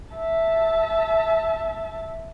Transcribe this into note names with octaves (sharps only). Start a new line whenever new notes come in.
E5 A5